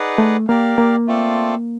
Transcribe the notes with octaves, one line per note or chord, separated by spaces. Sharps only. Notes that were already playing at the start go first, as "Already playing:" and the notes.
Already playing: D#4 G#4 B4 D5 F#5
A3
A#3 G4 A#4 D5 F5
A#3
A3 C4 F4 A4 D5